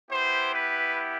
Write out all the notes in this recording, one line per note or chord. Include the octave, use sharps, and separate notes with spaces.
B3 E4 G4 C5
B4